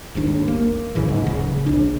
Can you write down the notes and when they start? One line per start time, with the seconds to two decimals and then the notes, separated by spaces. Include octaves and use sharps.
0.15 D#1 G#1 D#2 D4
0.48 A#3
0.95 B1 A#2 C#3 E3
1.08 G#2
1.26 D1 C#3
1.66 A#1 D4